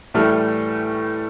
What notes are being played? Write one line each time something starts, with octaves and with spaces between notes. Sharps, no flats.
A2 E3 G3 A3 F6